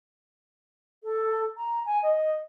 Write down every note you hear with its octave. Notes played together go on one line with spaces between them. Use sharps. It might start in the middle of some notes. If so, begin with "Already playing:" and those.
A4
A#5
G#5
D#5